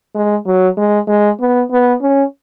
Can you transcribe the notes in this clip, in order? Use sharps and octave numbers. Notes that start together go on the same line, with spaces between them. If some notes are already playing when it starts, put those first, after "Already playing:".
G#3
F#3
G#3
G#3
B3
B3
C#4